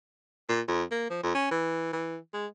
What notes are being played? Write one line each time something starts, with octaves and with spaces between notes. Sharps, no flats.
A#2
F2
A#3
F3
F2
C#4
E3
E3
G#3